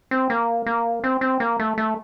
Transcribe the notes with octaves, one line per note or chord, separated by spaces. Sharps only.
C4
A#3
A#3
C4
C4
A#3
A3
A3